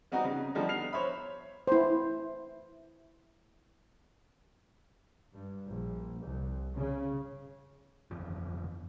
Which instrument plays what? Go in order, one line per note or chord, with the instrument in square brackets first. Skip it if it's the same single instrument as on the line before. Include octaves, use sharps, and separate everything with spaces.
[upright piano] G3 B3 C4 D#4 F#4
C#3
D3 F3 G3 A3 B3 D#4
B3 F6 C7 F7
C5 C#5 E5 B5
[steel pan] E4 C5
[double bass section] G2
A#1
C2
C#3
[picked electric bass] G1 F2 E3 F3